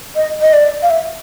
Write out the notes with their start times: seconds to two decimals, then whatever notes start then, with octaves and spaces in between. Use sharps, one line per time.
0.16 D#5
0.41 D#5
0.53 D5
0.82 F5
0.90 E5